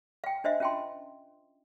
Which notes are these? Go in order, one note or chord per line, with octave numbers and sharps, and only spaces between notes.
F5 G5
D4 C5 D#5 E5
C#4 F4 G5 A5 C6